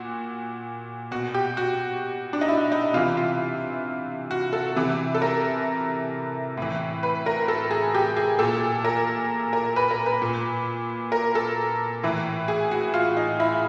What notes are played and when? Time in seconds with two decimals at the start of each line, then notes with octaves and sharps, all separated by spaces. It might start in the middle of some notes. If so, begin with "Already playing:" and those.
Already playing: A#2 F#4
1.11 B2 F#4
1.34 G4
1.57 F#4
2.33 D4
2.41 D#4
2.48 E4
2.72 D#4
2.93 C3 E3 F4
3.17 F4
4.31 F#4
4.53 A4
4.76 C3 E3
5.15 A4
5.22 A#4
6.57 A2 E3
7.03 B4
7.26 A#4
7.48 A4
7.71 G#4
7.95 G4
8.17 G#4
8.39 A#2 A4
8.85 A#4
9.53 A#4
9.76 B4
9.91 A#4
10.06 B4
10.22 A#2
11.12 A#4
11.35 A4
12.03 A2 E3
12.48 G#4
12.71 F#4
12.94 F4
13.17 D#4
13.40 E4